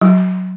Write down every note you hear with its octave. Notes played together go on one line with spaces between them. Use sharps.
F#3